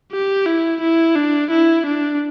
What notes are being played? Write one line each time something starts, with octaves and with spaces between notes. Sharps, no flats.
G4
E4
E4
D4
E4
D4